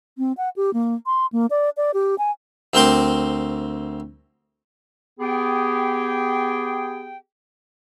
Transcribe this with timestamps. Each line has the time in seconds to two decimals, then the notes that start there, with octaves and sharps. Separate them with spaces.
0.18 C4
0.37 F#5
0.56 G4
0.74 A#3
1.06 C6
1.33 A#3
1.50 D5
1.77 D5
1.94 G4
2.18 G#5
2.73 D2 C4 A#4 G5 C6 D6
5.20 B3 G4 G#4 G5